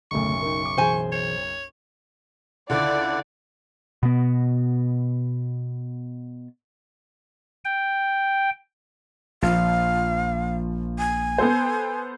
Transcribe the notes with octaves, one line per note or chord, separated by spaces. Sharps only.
F#1 B1 D3 A3 C#6
D#4 A#4
D6
B2 E3 G#4 C5 G#5
C#5
C#2 D3 E4 D5 F#5
B2 B3
G5
A#1 F3 F5
G#5
B3 A4 C5